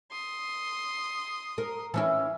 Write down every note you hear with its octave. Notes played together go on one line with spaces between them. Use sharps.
C6 D#6
A#4
E3 C#4 E4